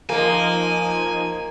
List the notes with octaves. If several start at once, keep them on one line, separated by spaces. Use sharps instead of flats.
F3 A#3 D#4 G#5